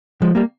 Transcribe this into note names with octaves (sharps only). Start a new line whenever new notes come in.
F3 G#3
G3 A#3